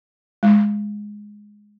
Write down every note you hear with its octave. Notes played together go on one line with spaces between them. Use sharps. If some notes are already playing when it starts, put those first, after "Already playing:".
G#3